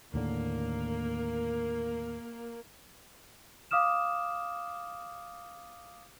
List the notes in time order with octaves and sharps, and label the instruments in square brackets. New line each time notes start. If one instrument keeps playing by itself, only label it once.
[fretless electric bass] D#2 A2 D3 [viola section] A#3
[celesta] F5 D6 D#6 F6 E7